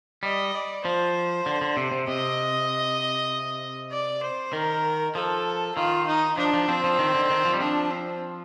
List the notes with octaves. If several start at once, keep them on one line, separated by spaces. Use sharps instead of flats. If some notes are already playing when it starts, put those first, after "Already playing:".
G3 D#5
D5
F3 C5
D3
D3
C3
C3
C3 D#5
D5
C5
D#3 A#4
F3 A4
D#3 F4
D#4
F3 D4
F3
F3 C4
F3
D#3
D3
D#3
F3
G3
F3 D4
C4